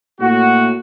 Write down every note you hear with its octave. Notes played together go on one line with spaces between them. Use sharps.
A2 A#3 F#4